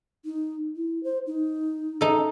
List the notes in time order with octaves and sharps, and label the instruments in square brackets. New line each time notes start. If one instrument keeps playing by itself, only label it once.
[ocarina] D#4
E4
C5
D#4
[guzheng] D#4 A4